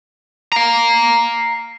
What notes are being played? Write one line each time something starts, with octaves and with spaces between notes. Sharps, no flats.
F5 A#5